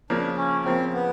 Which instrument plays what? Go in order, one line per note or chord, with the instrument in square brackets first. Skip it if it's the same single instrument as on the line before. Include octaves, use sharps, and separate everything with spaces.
[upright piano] C#3 F3 A#3 [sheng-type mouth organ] D4
[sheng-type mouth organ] C#4
[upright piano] C#3 F3 A#3 [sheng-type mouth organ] C4
[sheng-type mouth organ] B3